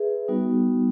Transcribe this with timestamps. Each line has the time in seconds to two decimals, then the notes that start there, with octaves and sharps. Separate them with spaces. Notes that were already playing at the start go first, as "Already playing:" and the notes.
Already playing: G#4 B4 E5
0.28 G3 B3 D#4 F#4